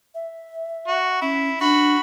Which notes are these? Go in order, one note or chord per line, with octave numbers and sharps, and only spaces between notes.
E5
F#4
C#4 E4
D4 F#4 B5